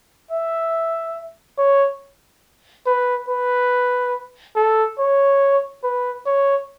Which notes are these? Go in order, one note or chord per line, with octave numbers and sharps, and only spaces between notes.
E5
C#5
B4
B4
A4
C#5
B4
C#5